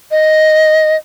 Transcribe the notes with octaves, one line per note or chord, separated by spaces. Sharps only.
D#5